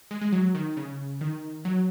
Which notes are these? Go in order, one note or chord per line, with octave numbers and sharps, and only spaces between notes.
G#3
G#3
F#3
D#3
C#3
D#3
F#3